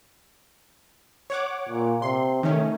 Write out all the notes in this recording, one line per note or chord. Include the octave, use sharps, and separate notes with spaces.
C#5 F#5 D6
A#2
C3 C6
D#3 A3 C#4